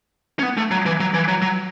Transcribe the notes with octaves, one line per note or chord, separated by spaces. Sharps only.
C#4
B3
A3
F#3
E3
F#3
E3
F#3
F#3